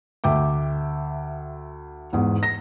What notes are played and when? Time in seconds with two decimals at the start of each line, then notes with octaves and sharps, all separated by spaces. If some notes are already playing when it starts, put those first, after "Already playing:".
0.24 D2 E5 G5 D6
2.13 E2 G#2
2.43 A#6